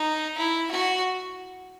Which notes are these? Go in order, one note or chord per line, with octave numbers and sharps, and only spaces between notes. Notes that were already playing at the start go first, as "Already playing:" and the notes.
Already playing: D#4
E4
F#4